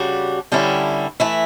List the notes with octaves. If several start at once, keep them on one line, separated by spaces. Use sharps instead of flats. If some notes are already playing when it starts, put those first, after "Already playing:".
Already playing: C#3 G3 D4 F#4
G2 D3 G3 C#4 E4
E3 A3 E4